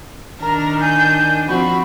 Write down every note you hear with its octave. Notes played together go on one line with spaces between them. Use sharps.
D#3 D4 A#4 A#5
G#5 G6
F3 C4 F#4 B5